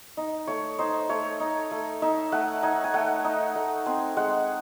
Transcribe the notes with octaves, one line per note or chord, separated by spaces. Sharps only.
D#4
A3 C#5
D#4 C5
A3 C#5
D#4
A3
D#4 E5
A3 F#5
D#4 G#5
G#5
A3 F#5
D#4
A3
C4 G#5
G#3 F#5